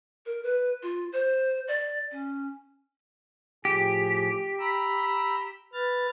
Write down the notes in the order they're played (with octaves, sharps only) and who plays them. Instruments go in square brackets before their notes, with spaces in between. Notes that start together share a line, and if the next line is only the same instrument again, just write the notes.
[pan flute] A#4
B4
F4
C5
D5
C#4
[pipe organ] A2 F3 G#4 [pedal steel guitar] G4
[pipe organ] A#5 B5 E6
B4 F6 A6